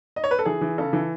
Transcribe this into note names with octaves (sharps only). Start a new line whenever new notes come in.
D#5
C#5
B4
A4
E3 G#4
E3
C#3 A4
E3